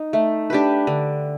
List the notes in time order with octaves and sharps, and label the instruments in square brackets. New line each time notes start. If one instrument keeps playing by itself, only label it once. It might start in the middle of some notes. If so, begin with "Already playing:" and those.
Already playing: [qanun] D#4
A3
D4 G4 B4
D3